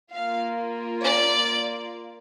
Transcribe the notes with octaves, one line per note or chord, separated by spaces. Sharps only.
A#3 F4 F5
D5